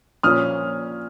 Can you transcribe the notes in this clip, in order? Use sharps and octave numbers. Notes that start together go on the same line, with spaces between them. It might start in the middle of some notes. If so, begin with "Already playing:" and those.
A#2 F3 A#3 C#4 D#6 F6